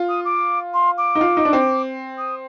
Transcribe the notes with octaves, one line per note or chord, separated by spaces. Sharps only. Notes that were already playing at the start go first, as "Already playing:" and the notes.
Already playing: F4
D#6
D6
C6
D6
D#4
F4
D#4
D4
C4
D#6